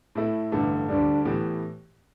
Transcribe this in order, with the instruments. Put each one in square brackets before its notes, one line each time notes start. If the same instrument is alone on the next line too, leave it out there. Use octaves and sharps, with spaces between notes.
[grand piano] A2 A3 E4
A1 G2 D3 A3
[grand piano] D2 D3 G3 [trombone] D4
[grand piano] A2 E3 B3 G4